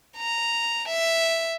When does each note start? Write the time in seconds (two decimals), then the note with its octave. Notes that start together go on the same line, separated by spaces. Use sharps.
0.17 A#5
0.88 E5